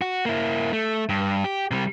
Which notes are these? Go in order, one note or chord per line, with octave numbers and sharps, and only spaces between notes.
F#4
A#3 E4
A3
G2
G4
C3 G3